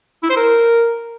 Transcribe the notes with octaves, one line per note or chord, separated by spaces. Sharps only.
E4
C5
A#4